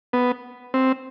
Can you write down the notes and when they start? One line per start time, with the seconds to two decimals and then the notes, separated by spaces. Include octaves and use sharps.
0.13 B3
0.74 C4